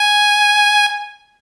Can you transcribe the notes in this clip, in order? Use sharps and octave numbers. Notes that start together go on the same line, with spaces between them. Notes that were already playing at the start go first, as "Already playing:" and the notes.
Already playing: G#5